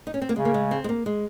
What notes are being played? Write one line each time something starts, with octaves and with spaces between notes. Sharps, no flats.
D#4
C#4
C4
A#3
C#3 G#3
A#3
G#3
C4
G#3
A#3
G#3